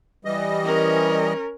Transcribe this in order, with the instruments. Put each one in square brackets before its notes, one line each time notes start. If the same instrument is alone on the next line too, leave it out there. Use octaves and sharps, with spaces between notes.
[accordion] E3 G3 D#5
[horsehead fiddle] C#4 A#4